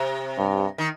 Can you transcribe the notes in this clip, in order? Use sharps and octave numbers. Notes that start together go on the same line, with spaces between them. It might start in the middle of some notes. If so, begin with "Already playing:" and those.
Already playing: C3
G2
D#3